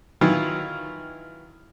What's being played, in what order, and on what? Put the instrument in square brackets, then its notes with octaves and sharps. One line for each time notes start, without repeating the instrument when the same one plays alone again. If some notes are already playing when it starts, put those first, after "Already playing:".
[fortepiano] D#3 E3 F#3 E4 F4